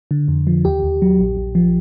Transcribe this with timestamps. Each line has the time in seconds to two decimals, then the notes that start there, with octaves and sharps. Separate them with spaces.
0.11 D3
0.28 F2
0.47 F3
0.64 D#2 G4
0.83 D#2
1.02 F#3
1.19 A#1
1.37 A#1
1.55 F3